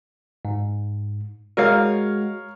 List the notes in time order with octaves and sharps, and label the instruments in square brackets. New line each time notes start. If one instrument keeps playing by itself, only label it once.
[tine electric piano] G#2
[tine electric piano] G#3 F#4 [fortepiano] A#4 C#5 F5